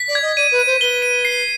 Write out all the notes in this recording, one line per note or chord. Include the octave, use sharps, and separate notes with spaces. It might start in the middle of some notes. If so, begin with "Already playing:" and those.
Already playing: B6
D5
G#6
D#5
D5 D#7
B4
D#7
C5
B4 G7
D#7
C7